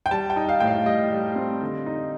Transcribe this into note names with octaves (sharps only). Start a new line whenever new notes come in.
G5
G3 A5
G5
D#4
F5
A2 G5
F5
G3 D#5
G3
C4
D3
D#4